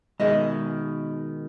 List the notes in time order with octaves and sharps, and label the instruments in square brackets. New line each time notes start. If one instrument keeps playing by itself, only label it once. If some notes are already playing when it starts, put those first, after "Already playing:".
[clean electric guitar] B2 D#3 [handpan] G#3 G#4 [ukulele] D#5 E5